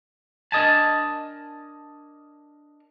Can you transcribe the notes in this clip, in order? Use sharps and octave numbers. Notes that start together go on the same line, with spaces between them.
D4 A#4 D#5 G#5 A5